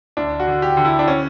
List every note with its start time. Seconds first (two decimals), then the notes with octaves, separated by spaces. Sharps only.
0.17 D2 D4
0.40 F#4
0.47 D3
0.62 G4
0.77 D3
0.85 E4
0.99 D4
1.08 C#4